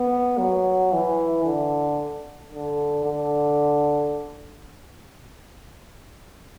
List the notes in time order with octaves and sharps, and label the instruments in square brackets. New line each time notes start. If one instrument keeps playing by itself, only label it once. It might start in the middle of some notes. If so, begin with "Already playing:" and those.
Already playing: [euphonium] B3
F#3
E3
D3
D3
D3